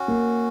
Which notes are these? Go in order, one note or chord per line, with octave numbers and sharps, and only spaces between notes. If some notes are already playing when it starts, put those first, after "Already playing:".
Already playing: C#4 F#4
A#3